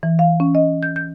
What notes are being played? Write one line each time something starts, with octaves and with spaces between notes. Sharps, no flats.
E3
F5
C#4
D#5
G6
G6